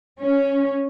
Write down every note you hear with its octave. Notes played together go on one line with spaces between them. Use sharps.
C#4